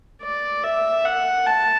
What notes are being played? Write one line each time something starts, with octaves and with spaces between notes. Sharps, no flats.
D5
E5
F#5
A5